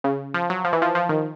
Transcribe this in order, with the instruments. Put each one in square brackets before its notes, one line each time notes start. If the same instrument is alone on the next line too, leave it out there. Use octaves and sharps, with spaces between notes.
[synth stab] C#3
F3
F#3
F3
E3
F3
F3
D#3